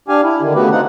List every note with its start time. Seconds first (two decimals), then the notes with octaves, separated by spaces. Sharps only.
0.08 D4 G4 F5 G#5
0.24 E4
0.41 D3 D#3
0.55 C#3 A3 B3 F#4 G4 B4
0.72 C4 D#4 F4 F#5